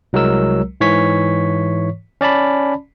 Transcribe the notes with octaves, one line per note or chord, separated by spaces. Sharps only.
C2 F#3 G#3 A#4 E6
G#2 E3 C#5 C#6 B6
C#4 D5 A5 B5